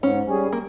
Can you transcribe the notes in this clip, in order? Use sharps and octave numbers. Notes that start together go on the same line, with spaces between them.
G#2 C#4
G3 C#4 G#4
A#3